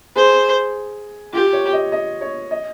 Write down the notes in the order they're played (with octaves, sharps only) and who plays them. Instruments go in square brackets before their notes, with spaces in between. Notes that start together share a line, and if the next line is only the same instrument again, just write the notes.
[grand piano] G#4 [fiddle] C5
[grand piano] F4 [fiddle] G4
[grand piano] C#5
D#5
D#5
C#5
D#5